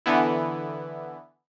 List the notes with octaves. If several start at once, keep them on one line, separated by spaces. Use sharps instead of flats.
D3 E3 B3 E4